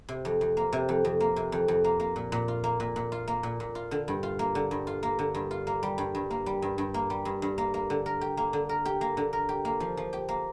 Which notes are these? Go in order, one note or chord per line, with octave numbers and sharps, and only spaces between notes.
C3
F2
F2
A#3
C3
F2
F2
A#3
C3
F2
F2
A#3
A#3
A#2
A#2
F4
A#3
A#2
A#2
F4
A#3
A#2
A#2
F4
D3
G2
F4
A#3
D3
G2
F4
A#3
D3
G2
F4
A#3
G3
G2
G2
A#3
G3
G2
G2
A#3
G3
G2
G2
A#3
A#3
D3
A#4
G4
A#3
D3
A#4
G4
A#3
D3
A#4
G4
A#3
F3
F3
G4
A#3